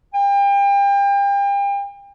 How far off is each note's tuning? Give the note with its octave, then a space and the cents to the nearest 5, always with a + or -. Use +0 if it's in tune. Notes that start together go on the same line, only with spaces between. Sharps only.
G5 +35